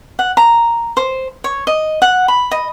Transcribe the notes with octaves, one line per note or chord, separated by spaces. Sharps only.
F#5
A#5
C5
C#5
D#5
F#5
B5
D#5